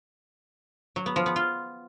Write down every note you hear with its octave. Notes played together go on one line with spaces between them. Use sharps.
F#3
B3
F3
B3
F4